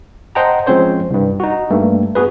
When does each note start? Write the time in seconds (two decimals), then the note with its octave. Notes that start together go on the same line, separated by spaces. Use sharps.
0.35 C5 D#5 F#5 G5 A5 A#5
0.66 F3 G#3 C4 C#4 C5 C#5
1.10 C2 G2
1.40 D#4 F#4
1.70 G2 A3 A#3
2.15 B3 F#4 G#4 B4